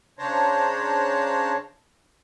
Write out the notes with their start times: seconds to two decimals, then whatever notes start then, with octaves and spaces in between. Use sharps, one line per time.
0.19 C#3 D4 C5 C#5 A5 A#5